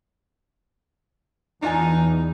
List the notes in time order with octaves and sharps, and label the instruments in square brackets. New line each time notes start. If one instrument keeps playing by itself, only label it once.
[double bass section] E2 [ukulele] D4 F4 G#5 [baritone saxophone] D#4